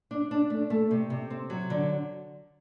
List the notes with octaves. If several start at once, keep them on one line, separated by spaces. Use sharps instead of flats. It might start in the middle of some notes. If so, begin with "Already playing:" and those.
D4
D4
A3
A3
C3
C3
C4
F#3
D3